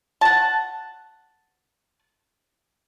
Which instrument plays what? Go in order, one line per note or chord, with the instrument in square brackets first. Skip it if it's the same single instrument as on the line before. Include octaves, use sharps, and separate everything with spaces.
[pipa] F#5 A5